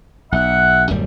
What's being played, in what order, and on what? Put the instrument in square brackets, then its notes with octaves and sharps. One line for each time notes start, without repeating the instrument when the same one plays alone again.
[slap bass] B1 [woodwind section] E5 F#5
[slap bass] D1 F#2 G3